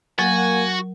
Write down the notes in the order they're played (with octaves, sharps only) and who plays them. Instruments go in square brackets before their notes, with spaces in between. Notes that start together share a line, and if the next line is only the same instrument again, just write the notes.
[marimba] F#3 A#4 [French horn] A#3 [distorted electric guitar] F#4 [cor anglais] G#5